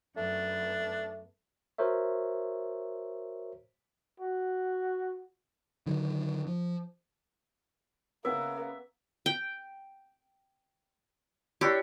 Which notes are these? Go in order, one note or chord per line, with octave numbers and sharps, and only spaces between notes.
F#2 A3 B3 D4
F#4 A#4 C5 C#5 E5
F#4
D3 D#3 F#3
F3
C#3 A#3 B3 C#4 B4 E5 F#5
G5
D4 E4 G4 C#5